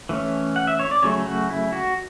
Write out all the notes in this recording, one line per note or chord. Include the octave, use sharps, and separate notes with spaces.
E3 A3 C#4
F#5
E5
C#5
D5
C#3 F#3 A3 C#5
F#4
E4
F#4